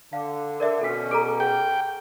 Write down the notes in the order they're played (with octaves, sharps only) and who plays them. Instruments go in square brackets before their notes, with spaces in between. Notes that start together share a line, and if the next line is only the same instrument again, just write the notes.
[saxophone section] D3 [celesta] F5
[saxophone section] D3 [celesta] A#4 D5 E5
[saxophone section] B2 C#4 [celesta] A4 B6
[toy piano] G#4 A4 A#5 [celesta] D6 D7
[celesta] G#4 [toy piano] F#5 [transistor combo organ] G5